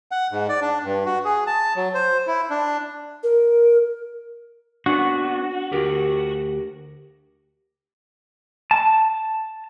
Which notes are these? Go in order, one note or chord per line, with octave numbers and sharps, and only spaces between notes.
F#5
G#2
D5
D4
G2
F#4
G#4
A5
F#3
C5
E4
D4
A#4
B3 C#4 D4 F#4
D2 G4 A#4
A5